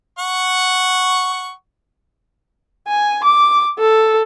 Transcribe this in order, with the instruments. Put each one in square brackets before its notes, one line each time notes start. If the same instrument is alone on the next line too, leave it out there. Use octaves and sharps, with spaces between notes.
[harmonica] F#5 C#6
[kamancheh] G#5
D6
A4